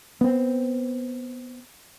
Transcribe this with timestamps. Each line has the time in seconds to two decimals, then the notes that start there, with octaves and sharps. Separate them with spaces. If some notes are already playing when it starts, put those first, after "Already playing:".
0.21 B3 C4